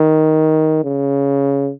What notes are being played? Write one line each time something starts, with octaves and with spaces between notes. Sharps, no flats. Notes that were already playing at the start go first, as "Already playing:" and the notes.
Already playing: D#3
C#3